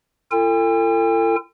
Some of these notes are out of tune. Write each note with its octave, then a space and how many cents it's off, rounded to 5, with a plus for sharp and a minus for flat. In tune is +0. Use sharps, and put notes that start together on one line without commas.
F4 -45 A4 +40 G5 +45